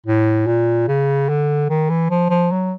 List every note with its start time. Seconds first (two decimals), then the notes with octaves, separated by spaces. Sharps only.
0.06 A2
0.47 A#2
0.88 C#3
1.29 D3
1.70 D#3
1.90 E3
2.10 F3
2.30 F3
2.52 F#3